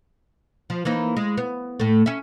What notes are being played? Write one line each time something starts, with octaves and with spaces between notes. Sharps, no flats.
F3
E3 A#3 D#4
G#3
B3
A2 A3
C#4 E5